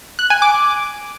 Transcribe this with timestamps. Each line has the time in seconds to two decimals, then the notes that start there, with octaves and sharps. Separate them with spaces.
0.19 F#6
0.30 G#5
0.42 D6